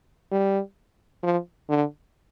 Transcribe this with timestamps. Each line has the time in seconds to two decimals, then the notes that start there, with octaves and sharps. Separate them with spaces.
0.31 G3
1.23 F3
1.69 D3